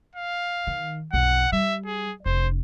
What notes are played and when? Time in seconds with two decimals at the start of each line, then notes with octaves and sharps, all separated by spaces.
0.15 F5
0.67 D#3
1.13 B1 F2 F#5
1.52 G3 E5
1.86 G#4
2.25 F1 D4 C5